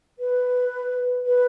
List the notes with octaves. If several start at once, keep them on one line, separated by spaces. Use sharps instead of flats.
B4
B4